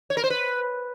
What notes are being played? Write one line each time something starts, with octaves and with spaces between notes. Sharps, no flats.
C#5
A#4
C5
B4